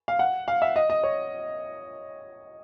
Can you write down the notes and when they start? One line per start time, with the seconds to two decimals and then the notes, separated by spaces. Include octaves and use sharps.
0.08 F5
0.19 F#5
0.48 F5
0.62 E5
0.76 D#5
0.90 D#5
1.03 C#5